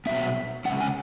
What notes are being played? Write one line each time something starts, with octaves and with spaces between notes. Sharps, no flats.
B2 F#3 B3 E5
C#3 E3 G#3 C#4 F#5
G#5